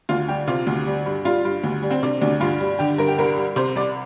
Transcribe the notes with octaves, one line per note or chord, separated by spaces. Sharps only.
D2 F4
G3 G4
C3 F4
D2
G3
G2
G3 F4
G2
D2
G3
C4
C3 D4
D2 D4
G2 F4
G3
D3 G4
G2 A#4
G4
C2 A#4
G3
C3 C5
C2 D5